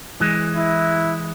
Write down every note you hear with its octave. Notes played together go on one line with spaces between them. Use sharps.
E3 G#3
E4